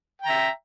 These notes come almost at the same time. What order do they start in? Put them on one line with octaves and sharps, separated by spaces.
G5 A#5 E5